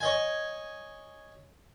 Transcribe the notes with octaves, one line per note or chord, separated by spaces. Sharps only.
C#5 D#5 G#5